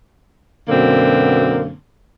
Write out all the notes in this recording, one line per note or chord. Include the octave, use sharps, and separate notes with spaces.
F#2 B2 D3 A#3 C4